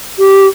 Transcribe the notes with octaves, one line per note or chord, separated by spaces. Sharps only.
G4